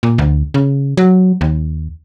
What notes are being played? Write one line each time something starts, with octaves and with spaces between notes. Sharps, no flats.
A#2
D2
C#3
F#3
D#2